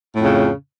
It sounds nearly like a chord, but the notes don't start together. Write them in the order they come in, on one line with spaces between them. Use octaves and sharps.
A2 F2 C#3